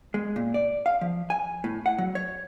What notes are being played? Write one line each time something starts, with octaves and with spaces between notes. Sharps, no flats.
G#3
A#2
D5
F5
F3
G#5
A2
F#5
F#3
C#5